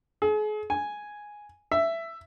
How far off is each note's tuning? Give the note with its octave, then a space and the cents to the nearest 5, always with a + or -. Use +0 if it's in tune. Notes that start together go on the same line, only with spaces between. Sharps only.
G#4 +40
G#5 +0
E5 +10